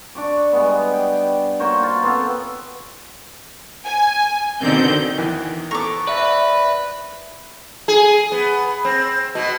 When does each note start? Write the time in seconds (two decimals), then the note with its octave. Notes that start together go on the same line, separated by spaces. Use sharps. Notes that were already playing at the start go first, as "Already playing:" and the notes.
0.15 D4 C#6 D6
0.53 G3 G#3 B3
0.93 G5
1.59 A#3 F#4 C5 C#5
1.83 F4
2.03 B3 C4 F4 A4
3.84 G#5
4.61 B2 D3 D#3 C4 G6
5.18 E2 D#3 E3
5.71 B3 A4 A#5 C#6 D6
6.07 B4 D5 E5
7.88 G#4
8.32 B3
8.85 C4
9.35 B2